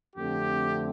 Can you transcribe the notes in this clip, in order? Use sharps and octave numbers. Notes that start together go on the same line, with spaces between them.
F2 D3 A3 C4 G4